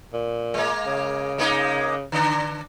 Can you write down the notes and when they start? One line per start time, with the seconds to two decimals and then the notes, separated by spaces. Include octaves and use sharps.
0.14 A#2
0.54 G#3 A#3
0.87 C#3
1.38 G#3 A#3 D#4
2.12 D3 D4